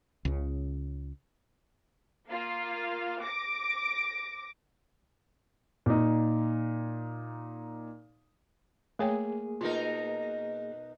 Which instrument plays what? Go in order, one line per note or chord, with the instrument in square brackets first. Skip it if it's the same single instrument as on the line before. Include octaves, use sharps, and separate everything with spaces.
[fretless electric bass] C#2 C#3
[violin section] A#3 F4 F5
D6 A#6 D7
[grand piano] A#2 D#4
[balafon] A3 C#5 G5 [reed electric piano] A#3 G#4
[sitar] B2 D#4 A#4 [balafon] F4